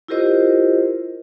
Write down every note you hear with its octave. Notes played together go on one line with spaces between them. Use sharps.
E4 F4 G4 A#4 C5 D#5